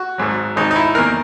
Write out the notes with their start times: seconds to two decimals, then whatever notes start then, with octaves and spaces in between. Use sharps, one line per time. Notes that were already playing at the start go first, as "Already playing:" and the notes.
Already playing: F#4
0.18 G#1 G#2 F#3
0.56 G#1 G#2 D#3 D#4
0.71 D#4
0.76 E4
0.95 E2 D#3 A#3 A#4